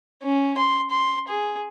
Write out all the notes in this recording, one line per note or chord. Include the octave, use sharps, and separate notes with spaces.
C#4
C6
C6
G#4